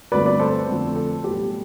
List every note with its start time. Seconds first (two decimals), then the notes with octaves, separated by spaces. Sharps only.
0.12 G1 G2 D3 A3 C4 B4 D5
0.26 B4 D5
0.40 A4 C5
0.68 F2 D3 A3 C4
0.96 A4
1.24 B1 A2 E3 G3 B3 G4